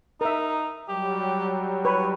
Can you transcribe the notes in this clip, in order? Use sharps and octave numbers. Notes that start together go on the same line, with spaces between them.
D#4 A#4 E5
F#3 G3 G4
B4 C#5